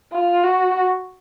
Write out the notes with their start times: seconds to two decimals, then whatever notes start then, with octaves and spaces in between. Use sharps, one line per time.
0.12 F4
0.44 F#4